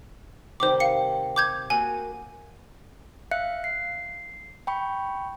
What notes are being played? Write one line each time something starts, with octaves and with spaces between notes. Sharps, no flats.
C3 D#3 G3 C5 D6
F5 C#7
D6 G6 G#6
A#3 F#4 G#4 G#5
E5 F5 F#6 C#7
C7
G5 B5 C#6